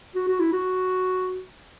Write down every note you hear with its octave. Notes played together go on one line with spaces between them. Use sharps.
F#4
F#4
E4
F#4